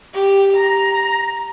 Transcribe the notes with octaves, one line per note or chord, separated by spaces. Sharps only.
G4
A#5